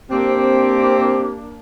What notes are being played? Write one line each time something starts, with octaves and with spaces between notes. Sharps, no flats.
A#3 C4 D4 G4